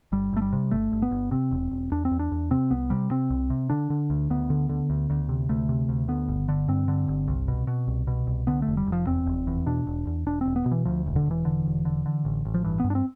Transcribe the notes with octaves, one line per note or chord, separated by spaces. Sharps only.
G1 G3
G1 A3
G3
C3
G1 A3
G1
B3
G1
C3 C4
E1
E1
E2 D4
C4
E2
D4
E2
C3 C4
C2 B3
C3 G3
C3 C4
C2
C3
D3 D4
D3
D2
D2 B3
D3
D3
D2
D2
C3
D2 A3
C3
D2
D3 B3
G1
D3
G2 C4
D3
G1
C2
B2
B2
C2
B2
C2
D3 B3
F1 A3
G3
F1
F3
E2 C4
F1
E2
B2 D4
E1
E2
E1 D4
E1 C4
B3
B2
E3
D2 F3
E1
D3
E1 E3
D3
E1
D3
D3
A1
A1
F3
G2 E3
G2 B3
D4
C4